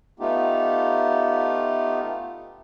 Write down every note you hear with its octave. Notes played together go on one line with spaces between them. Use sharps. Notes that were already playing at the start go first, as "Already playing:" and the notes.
A3 B3 D#4 F4 G4